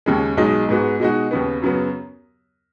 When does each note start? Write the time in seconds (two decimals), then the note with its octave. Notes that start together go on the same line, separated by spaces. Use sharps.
0.06 D#2 C#3 G#3
0.37 B1 B2 G#3 D#4
0.69 G#2 G#3 B3 F#4
1.00 B2 G#3 D#4 F#4
1.31 D#2 C#3 B3
1.62 F#2 C#3 F#3 B3